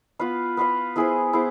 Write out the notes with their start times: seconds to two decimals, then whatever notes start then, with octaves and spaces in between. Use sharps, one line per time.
0.19 B3 F4 B4 F5
0.57 B3 F4 B4 F5
0.96 B3 E4 G#4 C5
1.33 B3 E4 G#4 C5